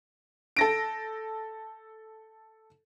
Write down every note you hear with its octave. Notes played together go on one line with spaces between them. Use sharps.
A4 A#6 D7